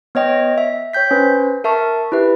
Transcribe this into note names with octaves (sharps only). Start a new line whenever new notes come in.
B3 C#5 D#5 G5 A#6
E5
C#5 G5 G6 B6
C#4 B4 C5
A#4 E5 A5 C#6
E4 G4 B4 E5